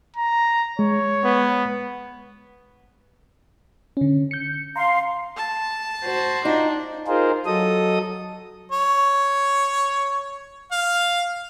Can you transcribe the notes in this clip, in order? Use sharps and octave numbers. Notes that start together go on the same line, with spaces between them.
A#5
G#3 C#5
B3
D3 C#4
G6 C#7
F5 A#5 C6
A5
F#4 C5
D4 D#4 F4
D#4 F4 G#4 A#4 C5
F#3 A4 D#5 D#6
C#5
F5